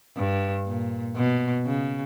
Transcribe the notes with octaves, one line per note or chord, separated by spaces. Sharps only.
G2
A#2
B2
C#3